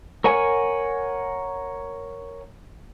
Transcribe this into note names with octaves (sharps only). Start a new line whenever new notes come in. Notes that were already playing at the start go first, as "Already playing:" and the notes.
A#4 C#5 F#5 G#5